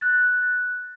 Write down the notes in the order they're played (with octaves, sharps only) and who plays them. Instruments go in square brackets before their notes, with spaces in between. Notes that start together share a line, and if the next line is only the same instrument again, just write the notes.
[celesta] F#6 A6